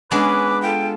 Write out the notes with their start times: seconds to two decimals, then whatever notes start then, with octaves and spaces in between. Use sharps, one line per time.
0.11 G#3 B3 C#4 D4 B4 D6
0.62 F4 A4 G5